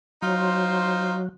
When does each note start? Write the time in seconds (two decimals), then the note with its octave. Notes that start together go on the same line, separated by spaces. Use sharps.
0.22 F#3 D#4 F4 C5